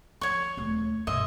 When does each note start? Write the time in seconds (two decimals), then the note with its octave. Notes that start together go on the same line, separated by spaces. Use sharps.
0.21 F3 C#5 C#6
0.57 D#1 A3
1.07 G2 B2 D#5 E5 C6